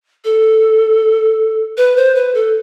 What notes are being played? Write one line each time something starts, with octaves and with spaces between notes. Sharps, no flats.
A4
B4
C5
B4
A4